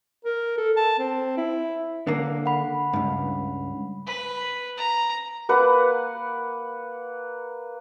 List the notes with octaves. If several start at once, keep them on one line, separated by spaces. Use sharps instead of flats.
A#4
A4
A5
C4
E4
D3 A#3
F#5 B5
C#2 G2
B4
A#5
A#3 B4 F#5